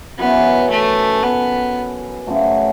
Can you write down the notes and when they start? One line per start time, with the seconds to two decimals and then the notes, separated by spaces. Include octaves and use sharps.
0.19 F#2 E3 B3 C#4
0.70 A3
1.23 B3
2.27 F#2 C#3 F#3 A3